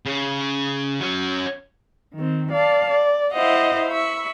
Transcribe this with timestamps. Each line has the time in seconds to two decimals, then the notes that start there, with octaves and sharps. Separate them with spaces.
0.06 C#3
1.00 F#3 C#4
2.14 D#3 C4
2.51 D5 F5 A5
2.90 D5
3.32 E4 C5 D#5 F5 F#5
3.90 E5 B5 C#6